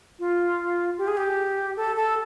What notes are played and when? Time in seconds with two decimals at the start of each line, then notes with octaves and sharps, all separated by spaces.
0.19 F4
0.98 G4
1.08 G#4
1.17 G4
1.77 A4
1.96 A4